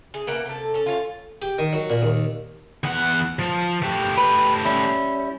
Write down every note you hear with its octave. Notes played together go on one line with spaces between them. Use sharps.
G#4
B2 A#3 A#4 F#5
C3 A4
C#4 A4
F4 C#5
G4
D#3
F#3
A#2
D#2
E2 F#5
F3
A3 G4
B4
G3 C#4 E4